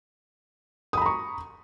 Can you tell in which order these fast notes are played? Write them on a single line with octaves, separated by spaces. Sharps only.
D#6 B5 A#5 C#6